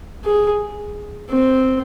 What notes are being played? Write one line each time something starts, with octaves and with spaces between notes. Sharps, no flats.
G#4
C4